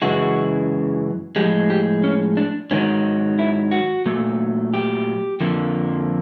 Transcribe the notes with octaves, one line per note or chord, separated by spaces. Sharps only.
F#2 C#3 E3 G#3 F#4
A2 F3 G#3 G4
G4
C#4
D4
G#2 D#3 F#3 C#4
E4
F#4
A#2 F#3 A3
G4
F2 D3 F3 A#3